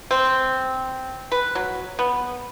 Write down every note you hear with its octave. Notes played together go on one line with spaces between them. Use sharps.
C4
B4
F#3
B3